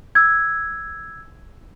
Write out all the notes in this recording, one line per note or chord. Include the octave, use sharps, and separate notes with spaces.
E6 G#6